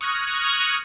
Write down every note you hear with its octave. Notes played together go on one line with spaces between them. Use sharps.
C#6 D#6 F6 F#6 G#6 A#6